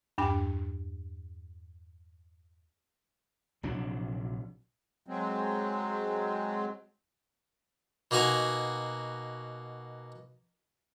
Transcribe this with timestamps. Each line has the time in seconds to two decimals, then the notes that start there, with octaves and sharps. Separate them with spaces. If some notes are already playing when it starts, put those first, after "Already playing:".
0.18 E2 G2 D4 G5
3.63 A#1 C3 F#3 D4
5.07 F#3 G#3 C4
8.11 B2 A#3 D#4 F#4 G#5